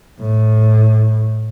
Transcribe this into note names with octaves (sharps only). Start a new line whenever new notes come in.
A2